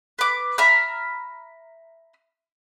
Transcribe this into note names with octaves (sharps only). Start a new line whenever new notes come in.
B4 D6
E5 A#5 B5 F6